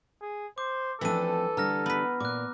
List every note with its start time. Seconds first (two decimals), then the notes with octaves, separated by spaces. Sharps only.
0.22 G#4
0.58 C5 D6
1.01 E3 F3 A3 C4 D4 A4 E6 D#7
1.57 D3 G3 A#5 F6 A#6
1.86 B3 B4
2.20 A#2 D6 F#6